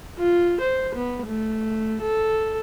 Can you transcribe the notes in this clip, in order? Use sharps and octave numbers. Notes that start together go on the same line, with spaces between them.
F4
C5
B3
A3
A4